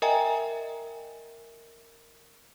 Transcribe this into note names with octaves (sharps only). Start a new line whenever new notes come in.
A#4 D#5 E5 G5 G#5 A#5